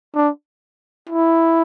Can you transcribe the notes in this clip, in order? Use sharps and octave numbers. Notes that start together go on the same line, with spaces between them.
D4
E4